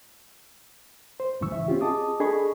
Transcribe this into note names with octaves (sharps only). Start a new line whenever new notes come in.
C5
C2 G#2 C#3 E3 C#6 E6
E5
C4 C#4 F4 G4
G#4 D#5 A5 D6 D#6
D4 G#4 A4 D#5 B5 C#6